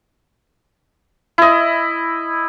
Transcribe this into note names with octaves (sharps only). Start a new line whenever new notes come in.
E4 D#5